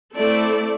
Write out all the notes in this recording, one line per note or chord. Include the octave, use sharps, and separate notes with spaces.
A3 C4 E4 A4 D5